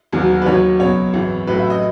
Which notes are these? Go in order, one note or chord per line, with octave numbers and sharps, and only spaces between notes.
E1 D#2 D#3 F#3
B4
D#2 D#3 F#3 C#5
C#2 B2 F#3 C#5
G#1 F#2 C#3 E3
A1 A2 F#3 B4
E5
D#5